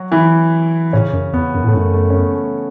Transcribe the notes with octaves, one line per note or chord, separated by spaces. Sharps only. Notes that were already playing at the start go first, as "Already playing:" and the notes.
Already playing: F#3 F#4
E3 E4
A2 C#3 C#4
F#2
E2 B3
F#2
A2 A3
F#2 B3
A3
C#4
B3
A3